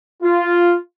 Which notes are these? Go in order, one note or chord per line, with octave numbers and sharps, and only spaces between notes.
F4